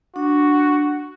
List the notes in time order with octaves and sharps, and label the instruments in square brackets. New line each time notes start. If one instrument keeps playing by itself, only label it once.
[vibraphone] D4 [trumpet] F#4